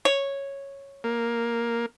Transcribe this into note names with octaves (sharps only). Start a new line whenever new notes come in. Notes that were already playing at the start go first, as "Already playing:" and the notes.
C#5
A#3